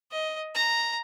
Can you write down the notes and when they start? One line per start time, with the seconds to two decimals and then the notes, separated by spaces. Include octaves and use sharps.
0.11 D#5
0.54 A#5